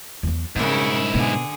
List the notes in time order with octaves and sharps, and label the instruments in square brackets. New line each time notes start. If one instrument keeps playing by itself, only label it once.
[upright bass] E2 F#3
[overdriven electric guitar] G#2 E4 [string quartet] C#3 A#4 [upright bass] G3
[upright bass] B2 B3 [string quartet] D3 G#4